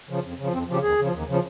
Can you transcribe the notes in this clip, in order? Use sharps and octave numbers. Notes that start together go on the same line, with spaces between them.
C#3 F3
F2
C#3 F3
F2 C4
C#3 F3 G4
D#2 G#4
C#3 F3
D#2
C#3 F3